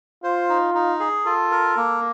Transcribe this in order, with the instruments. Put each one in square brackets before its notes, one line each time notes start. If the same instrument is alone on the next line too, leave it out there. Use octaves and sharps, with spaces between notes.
[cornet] F4 [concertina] C5
[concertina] D#4
D#4
G#4
[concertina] F4 [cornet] A4
[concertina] A#4
A#3